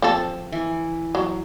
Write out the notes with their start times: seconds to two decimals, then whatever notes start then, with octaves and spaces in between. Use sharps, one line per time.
0.02 F3 C4 A4
0.52 E3
1.15 F#3